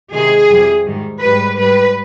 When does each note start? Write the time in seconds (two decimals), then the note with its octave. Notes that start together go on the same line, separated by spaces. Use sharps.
0.13 C3 D#3 G#3 G#4
0.49 F2 C3 G3
0.85 G#2 D#3 G3
1.22 G#2 G3 B4
1.58 G#2 G3 B4